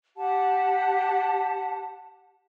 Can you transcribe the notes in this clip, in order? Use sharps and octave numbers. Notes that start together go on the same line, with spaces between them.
G4 F#5 A5